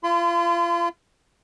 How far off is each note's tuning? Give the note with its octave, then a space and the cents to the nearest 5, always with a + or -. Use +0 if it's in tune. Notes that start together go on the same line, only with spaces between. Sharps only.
F4 -30 C6 -45